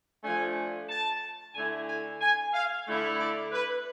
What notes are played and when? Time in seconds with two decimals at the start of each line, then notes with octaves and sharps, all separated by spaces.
0.24 F3 A3 D4 G#5
0.89 A5
1.55 D3 A3 E4 G#5
1.88 G#5
2.21 G#5
2.54 F5
2.86 D3 A3 E4
3.19 D5
3.52 B4